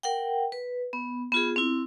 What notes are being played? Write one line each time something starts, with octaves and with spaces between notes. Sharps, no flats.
A#4 F#5 G5
B4
B3
B3 F4 G#4
C4 E4